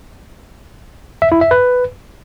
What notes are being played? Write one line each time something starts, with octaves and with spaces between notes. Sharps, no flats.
E5
E4
E5
B4